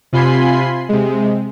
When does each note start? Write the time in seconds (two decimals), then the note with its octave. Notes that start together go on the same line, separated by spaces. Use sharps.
0.12 C3 F4 G#5 B5 C6 C7
0.89 C3 G#3